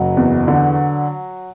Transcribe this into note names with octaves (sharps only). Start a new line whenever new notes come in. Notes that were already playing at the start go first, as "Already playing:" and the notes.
Already playing: F#1 F#3 F#4
E2
D3